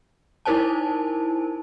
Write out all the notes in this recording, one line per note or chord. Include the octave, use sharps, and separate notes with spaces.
D#4 E4 A#4 C5 G#5 A5